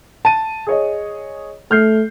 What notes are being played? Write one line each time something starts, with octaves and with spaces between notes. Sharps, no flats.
A5 D#7
G#4 C#5 D#5
A3 F6 G6 C7